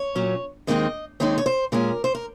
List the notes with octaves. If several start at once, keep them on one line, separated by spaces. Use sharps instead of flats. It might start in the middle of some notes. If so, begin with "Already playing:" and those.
Already playing: C#5
A#2 F#3 C#4
D#2 D#3 G#3 C4 D#4 D#5
D#2 D#3 G#3 C4 D#4 C#5
C#5
C5
A#2 G#3 C#4 A#4
C5
A#4